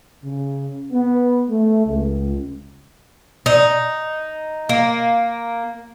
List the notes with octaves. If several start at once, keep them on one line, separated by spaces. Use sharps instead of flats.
C#3
B3
A3
C#2
D#4
A#3